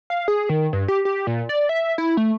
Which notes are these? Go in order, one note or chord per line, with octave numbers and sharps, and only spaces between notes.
F5
G#4
D#3
G2
G4
G4
A#2
D5
E5
E4
A3